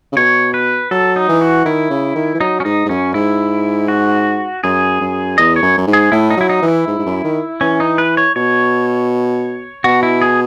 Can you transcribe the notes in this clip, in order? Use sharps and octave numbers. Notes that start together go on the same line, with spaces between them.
C#3
B2 C#5
B4
F#3 A4
D#4
E3
F#4
D#3 E4
C#3
D#3
E3
F#3 D#4
C#4
G#2 D#4
G#2
F#2 C#4
G#2 E4
F#4
F#2 G#4
F#2
E2 D#5
C#5
F#2
F#2
G#2
G#4
A2 E4
D#4
F#3 E4
D#4
E3
E4
G#2
G#2
F#2
D#3
E3 C#4
D#4
B4
C#5
B2 C#5
B2 F#4
E4
G#4